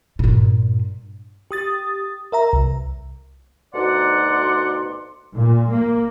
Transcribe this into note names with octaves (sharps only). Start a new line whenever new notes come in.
G2 A#2
G4 D#6 A6
A#4 E5 A#5
C2
D2 B2 D#4 D5 F#5 C6
A#2
A#3